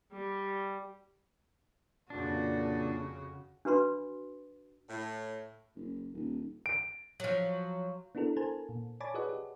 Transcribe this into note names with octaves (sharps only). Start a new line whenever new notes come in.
G3
F2 A#2 C#3 D4 F#4
D4 F#4 B4 B5 C6
A2
F#1
D#1
D7
F3 F#3
B3 D4 E4 F#4 A4 A#4
A4 A#4 C5 G#5 A5
A#2
C#5 D5 G#5 A5 B5 D6
F#4 G#4 B4 C#5 D#5 F#5
G4